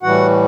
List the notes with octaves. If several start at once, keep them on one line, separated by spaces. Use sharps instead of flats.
A2 E3 G3 F#4 F#5